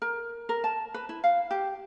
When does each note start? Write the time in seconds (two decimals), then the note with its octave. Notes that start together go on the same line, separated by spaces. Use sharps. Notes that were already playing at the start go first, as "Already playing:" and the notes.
0.02 A#4
0.49 A#4
0.64 A5
0.94 B4
1.09 E4
1.24 F5
1.51 G4